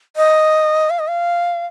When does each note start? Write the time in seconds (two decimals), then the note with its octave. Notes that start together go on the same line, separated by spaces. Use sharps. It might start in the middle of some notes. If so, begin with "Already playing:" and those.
0.16 D#5
0.90 F5
0.99 D#5
1.08 F5